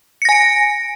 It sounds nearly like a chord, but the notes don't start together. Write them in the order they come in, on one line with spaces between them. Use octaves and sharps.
C#7 A#6 G#5 D7